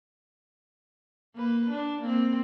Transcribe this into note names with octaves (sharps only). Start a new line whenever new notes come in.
A#3 B4
D4
A#3 C4